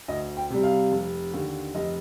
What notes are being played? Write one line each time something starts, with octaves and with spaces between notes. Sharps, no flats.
D2 D#5
G5
C3 G3
F5
F1
D#2 D3
F1 D#5